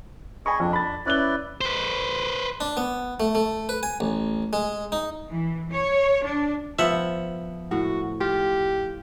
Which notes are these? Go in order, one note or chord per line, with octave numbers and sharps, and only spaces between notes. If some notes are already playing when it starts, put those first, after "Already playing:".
G#4 D#5 G#5 B5 C#6
F2 D4
B5 A6
C#4 E4 B4 D5 F#6 G7
B4 C5
D4
B3
A3
A3
B4
G#5
A1
G#3
D#4
E3
C#5
D4
F3 B3 E5 F#5
A2 F#4
F4 G4